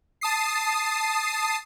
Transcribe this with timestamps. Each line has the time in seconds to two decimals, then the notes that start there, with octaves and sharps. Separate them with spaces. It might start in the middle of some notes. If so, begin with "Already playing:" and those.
0.21 A5 D#6 C7